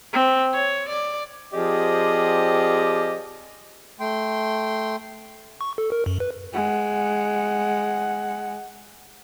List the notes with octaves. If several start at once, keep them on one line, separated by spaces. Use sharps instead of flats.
C4
C#5
D5
F3 C4 G4 G#4 D5 D#5
A3 G5 C6
C#6
A4
A#4
F#2
B4
G#3 F#5